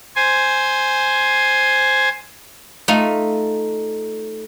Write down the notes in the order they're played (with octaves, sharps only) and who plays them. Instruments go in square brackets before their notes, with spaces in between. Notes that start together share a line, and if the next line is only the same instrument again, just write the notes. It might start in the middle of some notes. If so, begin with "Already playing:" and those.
[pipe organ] C5 G#5
[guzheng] A3 D#4 F4